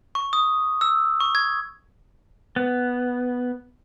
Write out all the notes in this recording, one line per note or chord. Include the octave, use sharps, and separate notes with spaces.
C#6
D#6
E6
C#6
G#6
B3